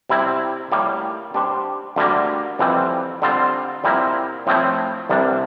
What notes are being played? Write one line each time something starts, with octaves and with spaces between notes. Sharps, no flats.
C3 G3 C4 E4
A2 G3 A#3
G3 D4 G4 C5
D2 D3 G3 A#3
F2 E3 G3 C4
D3 G3 C4 F4
A#2 G3 C4 E4 A#4
A2 F3 A3 C4 E4
C2 C3 E3 G3 D4